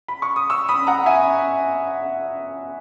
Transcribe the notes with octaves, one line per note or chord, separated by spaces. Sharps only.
B5
C#6
D#6
C#6 E6
B5 D#6
F#5 A#5
E5 G#5